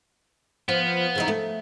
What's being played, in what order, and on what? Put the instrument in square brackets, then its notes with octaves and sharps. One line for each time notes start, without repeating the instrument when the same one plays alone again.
[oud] F3 [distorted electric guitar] B3
[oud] C#3 E3 D#4
A3